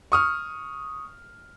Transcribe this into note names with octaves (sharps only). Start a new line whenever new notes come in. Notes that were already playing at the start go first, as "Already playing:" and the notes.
C#6 D#6 F6